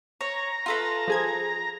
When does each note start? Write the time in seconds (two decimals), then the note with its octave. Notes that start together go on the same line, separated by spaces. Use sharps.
0.21 C#5 A#5
0.66 F4 A4 B4
1.08 F3 G#4 G#6